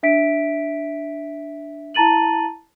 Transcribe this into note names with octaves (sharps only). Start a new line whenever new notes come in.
D4 E5 B6 D7
E4 A5 A#5 A6 D#7 F#7